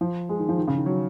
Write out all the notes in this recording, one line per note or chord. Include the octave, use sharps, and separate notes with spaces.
F3
G#3
D#3
F3
D#3
C#3
D#3
F#3